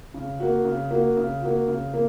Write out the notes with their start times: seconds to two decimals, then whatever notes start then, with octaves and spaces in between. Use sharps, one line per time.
0.14 C#3
0.40 A#3 F#4
0.65 C#3
0.91 A#3 F#4
1.17 C#3
1.42 A#3 F#4
1.68 C#3
1.94 A#3